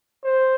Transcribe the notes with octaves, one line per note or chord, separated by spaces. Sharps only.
C5